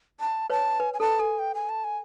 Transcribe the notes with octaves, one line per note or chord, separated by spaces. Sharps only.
A5
B4 C#5 A5
B4 G#5
G#5
A4 A5
A4 G#5
G5
G#5
A5
G#5